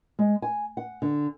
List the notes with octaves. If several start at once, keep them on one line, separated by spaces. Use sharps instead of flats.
G#3
G#5
F#5
D3